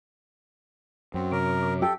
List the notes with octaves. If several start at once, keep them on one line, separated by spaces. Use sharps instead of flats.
F#2 C4
C3 A#4 C#5 D6
G4 A4 G5